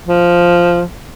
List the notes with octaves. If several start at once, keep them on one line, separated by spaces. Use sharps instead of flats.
F3